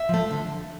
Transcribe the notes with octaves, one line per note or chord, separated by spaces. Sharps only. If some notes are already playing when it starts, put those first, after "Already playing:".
Already playing: E5
F3 A3
D3